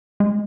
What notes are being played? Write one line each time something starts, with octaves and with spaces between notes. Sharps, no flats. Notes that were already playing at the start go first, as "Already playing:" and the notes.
G#3